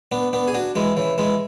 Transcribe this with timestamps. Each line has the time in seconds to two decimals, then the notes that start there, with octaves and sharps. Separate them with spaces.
0.12 B3 D4
0.33 B3 D4
0.48 G#4
0.54 D4 F#4
0.75 E3 G#3
0.97 C#3 E3
1.18 E3 G#3